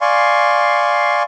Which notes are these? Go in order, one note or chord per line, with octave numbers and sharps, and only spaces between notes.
D5 F5 G#5 C6 C#6